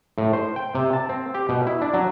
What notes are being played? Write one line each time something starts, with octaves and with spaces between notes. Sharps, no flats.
A2
C5
G5
C3
A5
C4
G4
B2
E4
D4
F#3